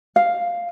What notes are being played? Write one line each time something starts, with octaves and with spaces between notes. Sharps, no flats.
F5